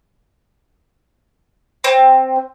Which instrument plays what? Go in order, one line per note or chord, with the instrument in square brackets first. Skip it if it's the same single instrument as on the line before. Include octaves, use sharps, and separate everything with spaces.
[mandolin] C4